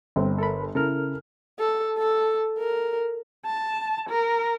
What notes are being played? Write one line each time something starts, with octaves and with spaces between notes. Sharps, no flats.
G1 C4
A4 A#4 B5
C#3 E4 A4 A#4 F6
A4
A4
A#4
A5
A#4